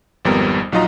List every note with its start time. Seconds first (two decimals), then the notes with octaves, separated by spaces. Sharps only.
0.25 G#1 F2 G3 B3 A#4
0.72 A#1 F#3 D#4 F4 D#5 A#5